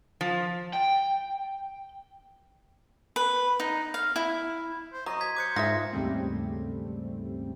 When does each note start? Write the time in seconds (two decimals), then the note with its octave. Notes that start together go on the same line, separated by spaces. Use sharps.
0.21 F3
0.73 G5
3.16 B4
3.60 D#4
3.94 F5
4.16 E4
4.93 C5
5.06 F#3 D#5 A#5 C6
5.21 G#6 B6
5.36 C5 D6 F#6 C#7
5.56 G#2 F4 G#4 E5 A#6
5.93 D#2 G#2 C#3 G3 A3 C4